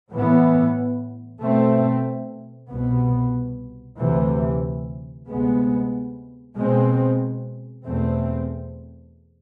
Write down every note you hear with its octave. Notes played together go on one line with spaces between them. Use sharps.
A2 E3 B3
B2 A3 C4
C2 B2 B3
D2 C3 E3
D2 C3 G#3 B3
B2 G#3 C4
E2 B2 A3 C4